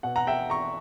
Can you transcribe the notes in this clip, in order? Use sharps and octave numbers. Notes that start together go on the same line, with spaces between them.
B2 F#5
F#5 A#5
E5 G5
A#5 C#6